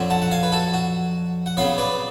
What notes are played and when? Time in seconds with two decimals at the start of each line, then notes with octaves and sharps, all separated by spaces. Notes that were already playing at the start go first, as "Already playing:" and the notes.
Already playing: F2 D3 F#3 C#4
0.10 F#5 A5
0.22 F#5
0.31 F5 G#5
0.43 B4
0.52 F#4 A4
0.73 F#4
1.46 F#5
1.57 C#3 F#3 B3 C#5 F5
1.78 B4 D5